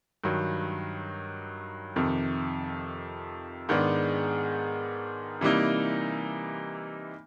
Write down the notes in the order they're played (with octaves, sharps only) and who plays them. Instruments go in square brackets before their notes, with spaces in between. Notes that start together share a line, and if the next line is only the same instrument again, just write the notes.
[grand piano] G2 D#3 F#3
F2 C3 D#3
G#2 D#3 G#3 B3 D4
C3 E3 G3 A#3 D#4